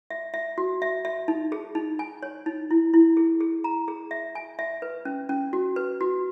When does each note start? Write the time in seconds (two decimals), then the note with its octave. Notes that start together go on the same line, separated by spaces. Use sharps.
0.10 E5
0.34 E5
0.58 F#4
0.82 E5
1.05 E5
1.28 D#4
1.52 G#4
1.75 D#4
1.99 G#5
2.23 C#5
2.46 D#4
2.71 E4
2.94 E4
3.17 G#4
3.41 G#4
3.64 A#5
3.88 G#4
4.11 E5
4.35 G#5
4.59 E5
4.82 B4
5.05 C#4
5.29 C#4
5.53 F#4
5.76 B4
6.01 F#4